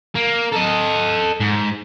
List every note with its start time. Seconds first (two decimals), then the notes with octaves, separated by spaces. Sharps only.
0.15 A#3
0.53 A4 D#5
1.40 G#2